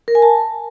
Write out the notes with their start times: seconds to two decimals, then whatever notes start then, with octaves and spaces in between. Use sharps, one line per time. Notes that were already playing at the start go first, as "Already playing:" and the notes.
0.08 A#4
0.15 G#5
0.22 A5